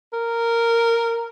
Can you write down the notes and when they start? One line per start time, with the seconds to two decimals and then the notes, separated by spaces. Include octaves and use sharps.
0.13 A#4